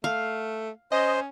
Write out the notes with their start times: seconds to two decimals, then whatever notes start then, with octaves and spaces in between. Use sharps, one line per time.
0.04 A3 F5
0.92 C#4 C5 D#5